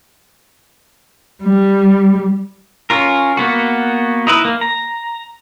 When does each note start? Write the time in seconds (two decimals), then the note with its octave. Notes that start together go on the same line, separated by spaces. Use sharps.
1.43 G3
2.90 C#4 F4 A#4
3.37 A#3 B3 F#4
4.27 D#4 E4 B4
4.45 A#3
4.61 A#5